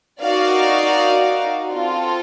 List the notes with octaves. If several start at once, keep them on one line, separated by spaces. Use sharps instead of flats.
D#4 F#4 A#4 D5 F5
C4 F4 A4